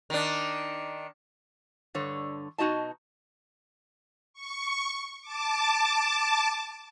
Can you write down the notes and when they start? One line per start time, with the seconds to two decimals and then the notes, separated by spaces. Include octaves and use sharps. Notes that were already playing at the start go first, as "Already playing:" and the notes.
0.10 D#3 D4
1.95 G2 D3 C#5
2.58 B2 D#4 F#4 D#5 A5
4.33 C#6
5.21 A5 D6